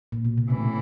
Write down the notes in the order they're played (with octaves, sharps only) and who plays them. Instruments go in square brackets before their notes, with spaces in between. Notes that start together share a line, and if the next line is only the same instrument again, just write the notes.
[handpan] A#2
B2
C3
[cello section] A2 E3 [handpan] C#3